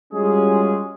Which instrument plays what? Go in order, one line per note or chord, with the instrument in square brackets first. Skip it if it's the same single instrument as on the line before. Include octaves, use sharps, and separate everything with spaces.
[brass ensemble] G3 G#3 C#4 F4 F#4 G#4